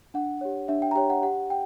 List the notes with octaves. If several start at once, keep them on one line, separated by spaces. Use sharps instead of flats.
D4 F#5
G4 C#5
D4 E5
G5
A#5
G4 C#5 G5
F#5
G4 F#5
G5